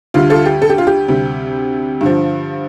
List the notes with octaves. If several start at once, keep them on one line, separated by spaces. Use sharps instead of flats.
D2 D3 G3 F4
F4 A4
G4
A4
G4
F4
G4
D2 C3 G3
G2 D3 F3